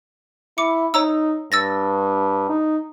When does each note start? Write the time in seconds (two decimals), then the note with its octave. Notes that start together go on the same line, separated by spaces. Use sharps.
0.58 E4 D6 C#7
0.94 D#4 C#5 A#5 E6
1.52 G2 E6 A6 A#6
2.49 D#4